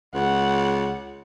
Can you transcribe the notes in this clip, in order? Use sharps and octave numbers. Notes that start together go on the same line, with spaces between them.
C#2 F#5